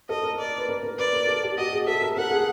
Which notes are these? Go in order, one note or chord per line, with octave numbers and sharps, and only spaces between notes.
A4 D#5
A#4
D5
B4
A#4
A#4
B4 D5
A#4
A4
G4
F#4 D#5
G#4
A4 E5
A#4
A4 F#5
G#4